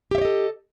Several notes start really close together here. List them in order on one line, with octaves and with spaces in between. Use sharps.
G4 E5 C#5 D#5 A4